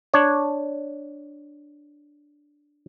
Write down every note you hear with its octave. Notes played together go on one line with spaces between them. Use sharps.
D4 C#5